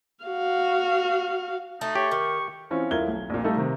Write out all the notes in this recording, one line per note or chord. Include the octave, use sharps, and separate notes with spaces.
F#4 F5
A3 D#4
G4 C#5
D#3 C#6
E3 C4 C#4 F4
D#1 E4 F4 A#4 G#6 G7
B1
A#1 A#2
G3 A3 D#4 F4 A4
C3 D#3